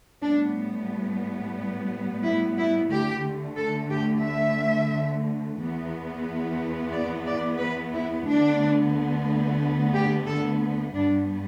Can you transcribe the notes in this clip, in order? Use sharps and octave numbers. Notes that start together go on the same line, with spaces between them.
A2 G3 B3 D4
E4
E4
D2 D3 A3 G4
A4
G4
E5
E2 E3 B3
D5
D5
B4
E4
D2 D3 B3 D4
G4
A4
G2 G3 B3 D4